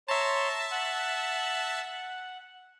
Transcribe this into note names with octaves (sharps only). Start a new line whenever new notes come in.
C#5 E5 A5 A#5 C6
F#5